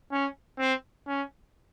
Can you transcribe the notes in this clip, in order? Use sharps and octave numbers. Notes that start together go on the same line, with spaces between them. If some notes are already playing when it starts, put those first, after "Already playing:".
C#4
C4
C#4